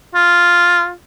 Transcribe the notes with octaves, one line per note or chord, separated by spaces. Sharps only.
F4